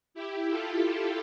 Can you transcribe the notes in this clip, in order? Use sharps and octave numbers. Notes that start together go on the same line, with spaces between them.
E4 G4
F4 A4